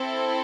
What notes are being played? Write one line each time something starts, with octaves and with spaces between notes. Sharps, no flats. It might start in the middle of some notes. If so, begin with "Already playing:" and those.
Already playing: C4 E4 A4